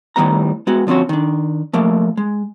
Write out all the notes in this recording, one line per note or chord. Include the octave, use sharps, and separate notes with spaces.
A2 D#3 G3 B3 A#5
G#3 B3 F#4
D3 F3 C4 C#4 F#4
D#3 D4
F3 A3 A#3
G#3